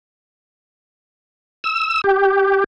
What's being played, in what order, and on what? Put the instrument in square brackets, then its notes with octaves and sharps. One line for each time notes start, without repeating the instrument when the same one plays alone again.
[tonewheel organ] E6
G4